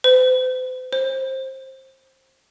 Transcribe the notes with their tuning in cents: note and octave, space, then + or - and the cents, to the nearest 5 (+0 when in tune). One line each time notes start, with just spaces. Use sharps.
C5 -40
C5 +20